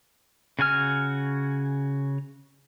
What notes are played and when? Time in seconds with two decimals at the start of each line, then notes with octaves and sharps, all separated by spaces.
0.59 C#3 F#4 G#5 F6